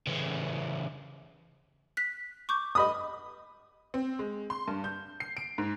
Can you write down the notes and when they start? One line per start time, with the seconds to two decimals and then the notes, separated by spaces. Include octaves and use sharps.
0.07 C#3 E3
1.97 F#6 B6
2.49 C#6 D6 G6
2.75 D#5 B5 D#6
3.94 C4
4.19 G#3
4.50 C6
4.68 G2
4.84 G6
5.20 C7
5.37 D7
5.58 G#2